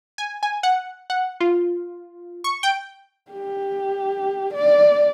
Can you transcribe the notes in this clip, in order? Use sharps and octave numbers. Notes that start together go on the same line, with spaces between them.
G#5
G#5
F#5
F#5
F4
C#6
G5
G4
D5